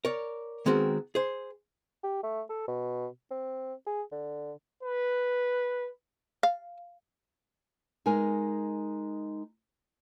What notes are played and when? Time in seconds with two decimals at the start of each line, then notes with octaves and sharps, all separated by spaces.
0.05 A#4 C#5 D5
0.66 D#3 G#3 B3 C4 F#4 A#4
1.15 G#4 C5
2.03 G4
2.23 A3
2.49 A4
2.68 B2
3.31 C4
3.86 G#4
4.12 D3
4.83 B4
6.43 F5
8.06 G#3 D#4 A#4 G#5